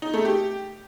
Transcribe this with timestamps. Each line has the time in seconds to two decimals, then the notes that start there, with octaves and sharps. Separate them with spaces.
0.02 D#4
0.14 A3
0.25 G4